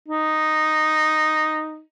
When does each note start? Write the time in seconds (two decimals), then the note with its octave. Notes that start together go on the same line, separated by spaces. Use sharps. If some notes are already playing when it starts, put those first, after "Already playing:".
0.08 D#4